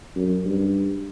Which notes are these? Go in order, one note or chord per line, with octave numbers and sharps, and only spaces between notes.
F#2
G2